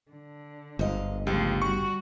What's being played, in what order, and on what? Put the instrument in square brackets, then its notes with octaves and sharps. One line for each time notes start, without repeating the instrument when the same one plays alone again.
[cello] D3
[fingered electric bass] G1 [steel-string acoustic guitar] G#2 D#5 F5
[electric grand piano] C#2 [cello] F3 A3 [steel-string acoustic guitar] G4
[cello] G3 F#4 [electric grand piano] C#6